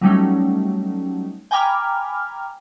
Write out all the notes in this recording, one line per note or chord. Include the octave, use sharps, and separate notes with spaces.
F#3 G3 A3 C#4 D#4
G5 G#5 A#5 B5 D6 F6